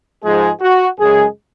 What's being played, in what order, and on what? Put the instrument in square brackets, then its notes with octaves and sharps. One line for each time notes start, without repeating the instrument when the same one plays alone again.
[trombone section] G#2 F3 G#3 G#4
F#4
F#2 C#3 G#3 G#4